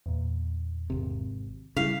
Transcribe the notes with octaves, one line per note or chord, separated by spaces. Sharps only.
E2 A#2
G#1 C3
C#3 G3 E4 F5 B6